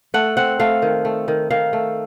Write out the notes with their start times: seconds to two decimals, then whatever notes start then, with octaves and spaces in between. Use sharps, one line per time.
0.14 A3 F#5
0.37 C4 F#5
0.60 A3 F5
0.82 D#3
1.05 A3
1.28 D#3
1.50 D#3 F5
1.73 A3